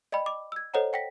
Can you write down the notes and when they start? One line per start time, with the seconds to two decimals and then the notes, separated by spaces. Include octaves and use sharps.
0.12 D5 D#5 G5 B5
0.26 D6
0.52 E6 G#6
0.74 A4 C5 C#5 D#5 F#5 A#5
0.93 F#5 G5 A#6 B6